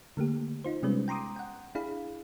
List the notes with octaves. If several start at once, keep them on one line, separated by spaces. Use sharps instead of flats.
D3 A3 A#3 G4
D#4 F4 C5
C3 G3 G#3 B3 C#4 B4
G5 A#5 C6 D6 D#6
F#5 G5
D4 E4 G#4 F5 B5